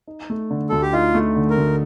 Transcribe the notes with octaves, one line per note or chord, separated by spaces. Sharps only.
D#4
A3
D3
D2 A4
G4
D#4 F4
A3
D3
A#4
D2